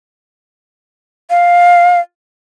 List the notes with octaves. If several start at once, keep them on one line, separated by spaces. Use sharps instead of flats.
F5